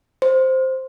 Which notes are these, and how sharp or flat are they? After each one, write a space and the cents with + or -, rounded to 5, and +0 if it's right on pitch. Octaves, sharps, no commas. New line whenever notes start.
C5 +0